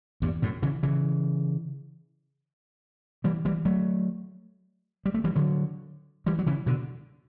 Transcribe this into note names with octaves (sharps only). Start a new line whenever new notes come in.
E2 G2
F#2 A2
C#3 E3
C#3 E3
E3 G3
E3 G3
F#3 A3
G3
A3
E3 G3
D3 F#3
E3 G3
F#3
C#3 E3
B2 D3